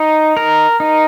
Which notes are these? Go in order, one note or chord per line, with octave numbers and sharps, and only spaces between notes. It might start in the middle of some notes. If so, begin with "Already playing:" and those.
Already playing: D#4
A#4
D#4